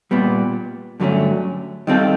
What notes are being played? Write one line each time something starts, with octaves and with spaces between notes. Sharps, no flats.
A#2 G3 B3
G2 D3 F#3 A3 C#4
D#3 G3 C4 F4 A4